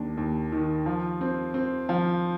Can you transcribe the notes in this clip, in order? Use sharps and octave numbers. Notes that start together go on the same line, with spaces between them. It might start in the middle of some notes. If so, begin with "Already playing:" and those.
Already playing: D#2 D4
D#2
D#3
F3
C4
C4
F3